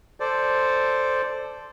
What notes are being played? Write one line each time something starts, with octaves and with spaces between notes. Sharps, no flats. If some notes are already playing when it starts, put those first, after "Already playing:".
A4 C5 D5